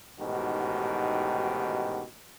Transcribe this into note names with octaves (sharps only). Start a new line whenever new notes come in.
A1 G#2 B2 D#3 F#4 G4